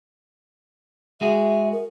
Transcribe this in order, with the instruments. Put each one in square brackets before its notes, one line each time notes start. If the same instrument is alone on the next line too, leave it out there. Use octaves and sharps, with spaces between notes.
[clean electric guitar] G#3 F#4 G#4 [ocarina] E5
[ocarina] A#4